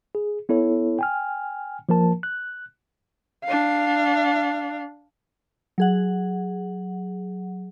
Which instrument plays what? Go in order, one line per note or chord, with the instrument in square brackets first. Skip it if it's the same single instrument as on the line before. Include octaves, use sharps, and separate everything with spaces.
[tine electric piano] G#4
B3 E4 A4 C#5
G5 G#5 F6
F3 A#3 A#4 A5
F#6
[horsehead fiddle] D4 F5
[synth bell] F#3 G#4 F#5